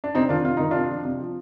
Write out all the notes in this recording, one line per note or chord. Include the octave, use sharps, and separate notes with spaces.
D4
C3 C4 D#4
D#3 D4 F4
C3 F4
D#3 D#4
C3 D4 F4
F3
C3
F3